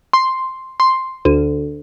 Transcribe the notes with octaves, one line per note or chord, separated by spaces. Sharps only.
C6
C6
D2